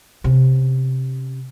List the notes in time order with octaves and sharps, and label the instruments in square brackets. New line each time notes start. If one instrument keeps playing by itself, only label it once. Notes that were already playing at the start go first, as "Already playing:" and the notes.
[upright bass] C3 C#4